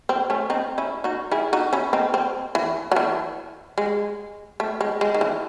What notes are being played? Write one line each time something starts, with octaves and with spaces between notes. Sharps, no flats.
C4
A3 C#4
C4 D#4
C#4 E4
D#4 F#4
E4 G#4
D#4 F#4
C#4 E4
C4 D#4
C4
E3
F#3
E3
G#3
A3
G#3
G#3
D#3
E3